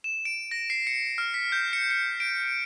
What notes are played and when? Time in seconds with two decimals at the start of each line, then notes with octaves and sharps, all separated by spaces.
0.04 E7
0.25 D7
0.51 A#6
0.70 C7
0.87 C#7
1.18 F6
1.34 B6
1.52 G6
1.73 C#7
1.91 C#7
2.20 D7